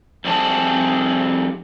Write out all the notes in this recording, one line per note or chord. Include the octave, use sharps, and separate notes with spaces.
F2 G3 C4 G#4 A5